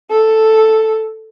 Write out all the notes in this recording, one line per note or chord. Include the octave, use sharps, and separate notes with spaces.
A4